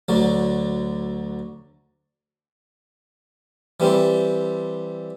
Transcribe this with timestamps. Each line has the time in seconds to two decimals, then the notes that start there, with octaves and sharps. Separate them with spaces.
0.09 D2 D3 F#3
3.80 E3 G3 C4